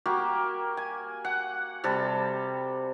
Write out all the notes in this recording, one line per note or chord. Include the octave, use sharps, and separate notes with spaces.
A#3 F#4 G4
G#5
F#5
C3 G3 A4